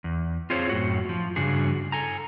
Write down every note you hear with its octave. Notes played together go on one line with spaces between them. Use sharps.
E2
C4 F4 G#4 C5 C#5
F#2 A2 F#4
F3
G2 C#3 D4 F#4 G#4
A4 G#5 A#5